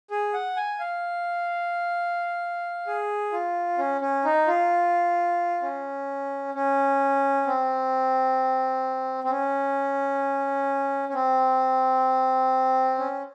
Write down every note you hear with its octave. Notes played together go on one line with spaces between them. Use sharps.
G#4
F#5
G#5
F5
G#4
F4
C#4
C#4
D#4
F4
C#4
C#4
C4
C4
C#4
C#4
C4
C#4